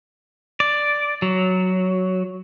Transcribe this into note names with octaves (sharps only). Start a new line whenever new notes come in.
D5
F#3